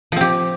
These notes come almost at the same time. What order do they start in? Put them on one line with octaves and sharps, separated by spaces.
F3 C4 G4